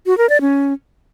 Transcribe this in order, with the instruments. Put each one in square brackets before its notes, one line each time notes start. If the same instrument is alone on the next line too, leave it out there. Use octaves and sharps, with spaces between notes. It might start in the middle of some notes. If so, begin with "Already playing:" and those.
[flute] F#4
A#4
D5
C#4